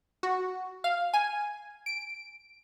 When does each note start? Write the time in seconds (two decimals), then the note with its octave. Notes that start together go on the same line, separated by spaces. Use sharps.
0.23 F#4
0.84 F5
1.13 G#5
1.86 D7